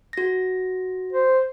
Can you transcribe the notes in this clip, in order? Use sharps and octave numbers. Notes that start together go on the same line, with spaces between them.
F#4 A#6
C5